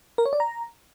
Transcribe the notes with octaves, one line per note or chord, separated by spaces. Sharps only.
A#4
C#5
D5
A#5